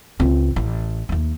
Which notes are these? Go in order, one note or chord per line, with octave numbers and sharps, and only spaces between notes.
C#2 C4
A1
D#2 A3